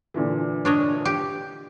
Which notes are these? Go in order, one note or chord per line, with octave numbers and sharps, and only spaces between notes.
A#2 D3 E3
D4 C#5 D#5
G4